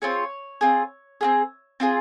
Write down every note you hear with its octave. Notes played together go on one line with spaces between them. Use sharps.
C4 F4 G#4 C#5
C4 F4 G#4
C4 F4 G#4
C4 F4 G#4